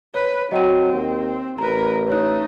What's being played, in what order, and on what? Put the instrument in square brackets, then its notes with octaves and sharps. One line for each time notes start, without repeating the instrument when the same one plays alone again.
[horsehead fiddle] B4 [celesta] C#5
[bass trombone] F#3 [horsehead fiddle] C4 [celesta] D#5 G5 D#7
[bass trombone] D#2
[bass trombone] A1 [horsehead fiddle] A#4 B4 [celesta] A#5
[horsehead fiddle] A3 D#4 [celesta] B4 C#5 F#6